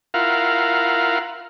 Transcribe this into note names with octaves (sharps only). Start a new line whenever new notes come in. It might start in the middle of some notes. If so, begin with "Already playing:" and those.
E4 F4 A#4 F5 F#5